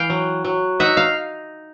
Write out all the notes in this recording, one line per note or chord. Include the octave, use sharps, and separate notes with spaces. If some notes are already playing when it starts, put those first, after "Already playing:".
Already playing: E3 F5 G5
F#3
F#3
D#4 E5 F#5
F5